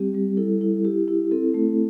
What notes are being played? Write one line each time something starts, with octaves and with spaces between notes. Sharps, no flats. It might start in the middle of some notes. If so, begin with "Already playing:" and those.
Already playing: G3 C4 G4
G3
E4 A4
E4
E4 G4
E4
C4 A4
A3